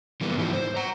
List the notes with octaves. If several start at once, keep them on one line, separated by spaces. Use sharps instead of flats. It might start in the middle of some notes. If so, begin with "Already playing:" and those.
E3 G3 A#3 B3
G#2 E3 F3 D#4 E4 F#4
C5
F#5 A#5